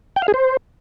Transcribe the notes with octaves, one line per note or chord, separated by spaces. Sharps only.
G5
F5
G#4
C5